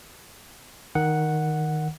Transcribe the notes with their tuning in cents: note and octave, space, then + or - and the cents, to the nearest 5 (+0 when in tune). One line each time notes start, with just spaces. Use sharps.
D#3 +0 F#5 +0